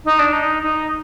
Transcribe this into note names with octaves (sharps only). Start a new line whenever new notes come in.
D#4
D4
D#4
D#4